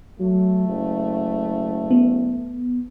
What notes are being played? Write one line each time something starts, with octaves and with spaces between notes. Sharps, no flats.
F#3 A3
F#1
B3